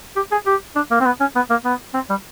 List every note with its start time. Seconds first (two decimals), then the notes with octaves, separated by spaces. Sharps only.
0.16 G4
0.32 G#4
0.46 G4
0.76 D4
0.91 A#3
1.01 C4
1.05 B3
1.20 C#4
1.36 B3
1.50 A#3
1.65 B3
1.94 C4
2.09 G3